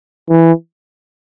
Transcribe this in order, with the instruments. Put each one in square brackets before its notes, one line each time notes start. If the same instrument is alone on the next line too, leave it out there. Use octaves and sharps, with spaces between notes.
[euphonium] E3